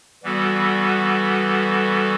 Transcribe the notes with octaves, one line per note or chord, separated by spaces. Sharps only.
E3 G3 B3 F#4 A4